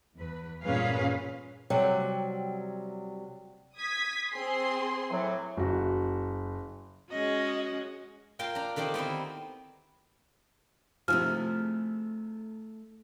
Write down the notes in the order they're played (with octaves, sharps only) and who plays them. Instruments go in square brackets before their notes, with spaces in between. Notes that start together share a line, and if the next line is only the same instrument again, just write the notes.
[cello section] E2 B4
G2 A#2 C#4 G#4 B4 F5
[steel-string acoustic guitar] C3 F#3 G3
[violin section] D#6 G#6 B6
C4 G#4 C6
[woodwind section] A2 E3 F#3
[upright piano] F#1 F#4
[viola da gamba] G#3 C#4 F#4 [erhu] D#5
[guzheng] A#3 F4 G5 C6
D4 A#5
D3 D#3 C4 G4
B3 C4 D#4 E4
[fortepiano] C3 D#3 F3 [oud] A3 E4 G#4 [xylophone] F6